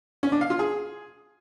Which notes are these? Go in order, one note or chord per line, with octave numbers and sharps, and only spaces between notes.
C#4
D4
F5
F4
G#4